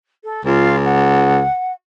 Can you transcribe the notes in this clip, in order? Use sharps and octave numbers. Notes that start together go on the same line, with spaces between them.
A4
C#2 F4
F#5